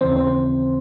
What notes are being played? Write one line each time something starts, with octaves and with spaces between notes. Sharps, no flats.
D#2 C#3 E3 C4 C5
C4 C5